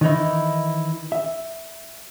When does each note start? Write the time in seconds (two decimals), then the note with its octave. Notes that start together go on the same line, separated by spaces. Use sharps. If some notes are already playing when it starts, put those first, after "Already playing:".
0.01 D#3 E3 D#4 E4
1.12 E5